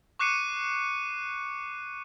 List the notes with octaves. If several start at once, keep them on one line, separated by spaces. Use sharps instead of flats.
C#6 D6 F#6 C7 C#7 D#7